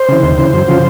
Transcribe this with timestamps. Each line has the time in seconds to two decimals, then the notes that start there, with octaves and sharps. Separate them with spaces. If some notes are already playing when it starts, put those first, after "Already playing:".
Already playing: C5
0.08 C#3 E3
0.23 D#2
0.38 C#3 E3
0.53 F#2
0.68 C#3 F3